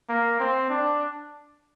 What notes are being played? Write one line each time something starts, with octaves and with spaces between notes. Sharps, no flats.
A#3
C4
D4